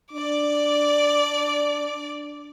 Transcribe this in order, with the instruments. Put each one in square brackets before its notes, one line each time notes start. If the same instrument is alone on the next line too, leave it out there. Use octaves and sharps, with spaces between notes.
[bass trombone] D4 [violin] D5 D6